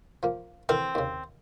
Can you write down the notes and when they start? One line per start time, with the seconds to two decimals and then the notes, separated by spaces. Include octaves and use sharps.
0.23 F3 A#3
0.69 D3 E3 C4 A#4
0.95 D#2 C#3